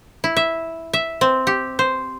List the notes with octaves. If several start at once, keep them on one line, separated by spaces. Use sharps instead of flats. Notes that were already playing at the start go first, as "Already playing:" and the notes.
E4
E5
E5
C4
G4
C5